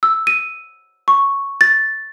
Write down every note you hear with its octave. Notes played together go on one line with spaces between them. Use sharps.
E6
D#7
C#6
A6